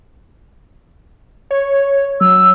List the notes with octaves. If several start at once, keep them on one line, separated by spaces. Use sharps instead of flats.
C#5
F#3 E6